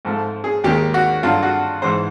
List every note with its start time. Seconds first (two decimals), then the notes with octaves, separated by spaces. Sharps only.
0.05 G#2 F3 A3
0.44 G#4
0.64 D#2 D#3 G#3 G4
0.94 F#4
1.23 G2 D3 F#3 F4
1.43 F#4
1.82 G#2 E3 G#3 C5